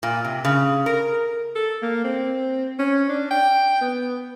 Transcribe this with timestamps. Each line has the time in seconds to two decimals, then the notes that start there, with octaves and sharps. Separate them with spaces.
0.03 A#2
0.25 C3
0.45 C#3
0.86 A#4
1.55 A4
1.82 A#3
2.04 C4
2.79 C#4
3.09 D4
3.31 G5
3.81 B3